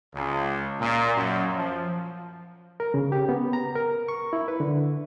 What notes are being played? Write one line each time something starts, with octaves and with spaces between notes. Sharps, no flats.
C#2
A#2
F#2
F3
A#4
C#3
G4
B3
A#5
A#4
C#6
E4
B4
D3